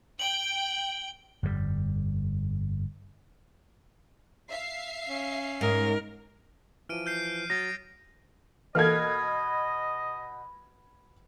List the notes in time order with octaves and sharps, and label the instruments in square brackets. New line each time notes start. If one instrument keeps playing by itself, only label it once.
[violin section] G5 [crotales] F#7 G7
[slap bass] G1 F2 A2 G3
[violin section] E5 F5 C7
[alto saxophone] C#4
[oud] G#2 [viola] A#4
[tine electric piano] E3 F3 [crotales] F6 D7 D#7
[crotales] F6 G6 C7
[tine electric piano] F#3 [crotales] D#6 A6 D7 [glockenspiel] A#6
[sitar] B2 [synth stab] E3 A#3 A4 [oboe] D#5 [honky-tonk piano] F6 G#6